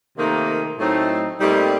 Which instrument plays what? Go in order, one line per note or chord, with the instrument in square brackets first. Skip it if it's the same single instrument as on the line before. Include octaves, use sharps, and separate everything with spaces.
[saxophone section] C3 D#3 A3 D#4 [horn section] A#3
[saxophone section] A2 F#3 C4 D#4 [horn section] A3
[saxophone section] A#2 A3 C4 D#4 [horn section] G3